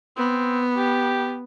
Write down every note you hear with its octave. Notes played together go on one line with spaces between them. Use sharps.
B3 C4
G4